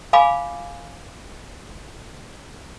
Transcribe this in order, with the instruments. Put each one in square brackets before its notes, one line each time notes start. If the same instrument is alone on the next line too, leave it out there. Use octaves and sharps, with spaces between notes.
[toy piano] F5 G#5 B5 D6